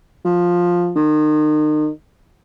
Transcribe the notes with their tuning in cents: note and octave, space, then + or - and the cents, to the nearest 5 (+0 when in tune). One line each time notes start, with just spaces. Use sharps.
F3 +10
D#3 -35